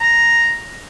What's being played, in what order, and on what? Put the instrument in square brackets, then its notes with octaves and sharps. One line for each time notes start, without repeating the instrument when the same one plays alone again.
[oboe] A#5